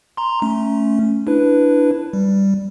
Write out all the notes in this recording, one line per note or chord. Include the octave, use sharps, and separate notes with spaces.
A#5 C6
A3 C#4
D4 E4 B4
G3